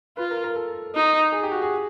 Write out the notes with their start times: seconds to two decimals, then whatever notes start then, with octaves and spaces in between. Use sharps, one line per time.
0.17 F4 B4
0.31 A#4
0.44 A#4
0.56 A4
0.95 D#4
1.32 G#4
1.43 G4
1.52 F#4
1.62 G#4